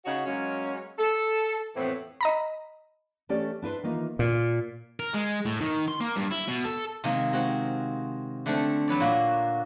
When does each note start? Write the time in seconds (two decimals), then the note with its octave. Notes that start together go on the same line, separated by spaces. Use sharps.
0.06 C#3 D#4 F#4 C#5 D#5 F#5
0.26 F#3 G#3 A#3 C#4
0.99 A4
1.76 F2 A2 E3 B3 C4
2.21 D#5 A#5 B5
3.29 E3 A3 C#4 G4 D5
3.62 D4 E4 B4 C5
3.83 D#3 E3 A#3 D#4 F4
4.19 A#2
5.00 A#4
5.14 G#3
5.46 A2
5.61 D#3
5.88 C6
6.00 A#3
6.16 G2
6.31 E4
6.48 B2
6.64 A4
7.04 C3 D#3 G#3 A#3
7.33 G#3 C4 F#4
8.46 D3 A3 C4 D4
8.88 F#3 B4 C#5 D5
9.00 A#2 A#3 F4 F#4